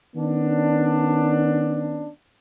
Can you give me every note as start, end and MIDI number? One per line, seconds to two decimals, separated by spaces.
0.16 2.09 51
0.16 2.09 59
0.16 2.09 61
0.16 2.09 62